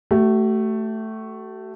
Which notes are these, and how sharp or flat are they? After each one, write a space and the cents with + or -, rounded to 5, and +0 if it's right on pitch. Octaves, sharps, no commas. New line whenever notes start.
A3 +0 F#4 +45